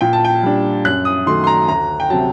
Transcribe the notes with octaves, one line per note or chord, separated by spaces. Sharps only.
A#2 G5
A5
G5
G3 D4
F#2 F#6
D#6
D#3 F#3 A3 C6
C6
A#5
D2 A#5
G5
C3 F#3 A5